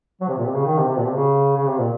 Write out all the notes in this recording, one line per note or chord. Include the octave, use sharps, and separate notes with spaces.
F#3
C3
A#2
C3
C#3
D#3
C3
C3
A#2
C3
C#3
C#3
C3
A#2